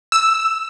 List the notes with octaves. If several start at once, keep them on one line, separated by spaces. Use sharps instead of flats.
E6